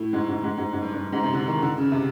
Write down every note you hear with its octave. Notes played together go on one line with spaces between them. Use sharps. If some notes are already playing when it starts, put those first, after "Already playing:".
Already playing: A2
G#2
G#2
G#2
G#2
G#2
G2
G2
G#2
C3
D3
D#3
D3
C#3
C3